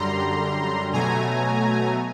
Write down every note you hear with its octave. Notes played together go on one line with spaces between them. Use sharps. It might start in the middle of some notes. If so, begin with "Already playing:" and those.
Already playing: F#2 D3 G3 A#5 C6
B2 F#3 A3 G#5 A#5